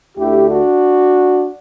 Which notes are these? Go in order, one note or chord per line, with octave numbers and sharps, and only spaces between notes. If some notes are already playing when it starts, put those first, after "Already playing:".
D2 D3 A3 E4 G4
D4 F#4